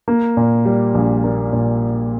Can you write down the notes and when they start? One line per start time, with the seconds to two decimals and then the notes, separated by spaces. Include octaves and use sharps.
0.08 A#3
0.37 A#2
0.66 G3
0.95 A#1
1.24 A#3
1.53 A#2